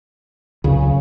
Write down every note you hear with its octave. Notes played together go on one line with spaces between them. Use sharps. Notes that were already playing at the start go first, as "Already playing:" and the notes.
C#2 F#2 C#3